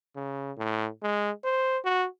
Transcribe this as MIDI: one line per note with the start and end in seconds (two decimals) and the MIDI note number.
0.15 0.52 49
0.57 0.88 45
1.02 1.31 56
1.44 1.78 72
1.84 2.07 66